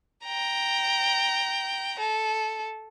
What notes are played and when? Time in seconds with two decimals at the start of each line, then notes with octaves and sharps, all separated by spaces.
0.25 G5 A#5
1.99 A4